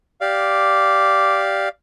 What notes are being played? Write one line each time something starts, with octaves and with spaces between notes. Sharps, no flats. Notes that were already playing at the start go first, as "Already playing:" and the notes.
G4 D5 F5